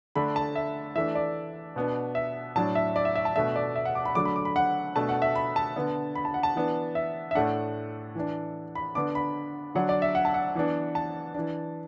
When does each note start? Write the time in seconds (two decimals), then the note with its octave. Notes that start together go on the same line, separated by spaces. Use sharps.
0.16 D3 A3 D4 B5
0.36 A5
0.55 E5
0.96 E3 A3 D4 E5
1.15 D5
1.76 B2 B3 D4
2.15 E5
2.55 A2 F#3 D4 A5
2.75 E5
2.96 D5
3.05 E5
3.16 E5
3.25 A5
3.35 B2 A3 D4 E5
3.56 D5
3.76 E5
3.85 F#5
3.95 D6
4.05 B5
4.15 D3 F#3 A3 D4 D6
4.25 B5
4.36 D6
4.45 B5
4.56 F#5
4.95 B2 A3 D4 A5
5.09 F#5
5.22 E5
5.35 B5
5.56 A5
5.76 D3 B3 D4
6.15 B5
6.25 A5
6.34 F#5
6.43 A5
6.55 E3 B3 D4
6.95 E5
7.31 E5
7.35 A2 A3 D4 F#5
8.15 E3 D4
8.75 B5
8.95 D3 B3 D4 D6
9.15 B5
9.75 D3 F#3 D4 F#5
9.89 D5
10.02 E5
10.15 F#5
10.25 A5
10.34 F#5
10.55 E3 B3 D4
10.95 A5
11.35 E3 D4